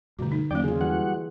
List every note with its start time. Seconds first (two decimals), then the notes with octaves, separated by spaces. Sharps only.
0.19 G2 B2 D3 A3 F#4
0.32 D#4
0.51 E2 F#3 A#3 C#4 D5 G5
0.64 C#3 F4 G#4
0.81 E3 G3 F#4 F#5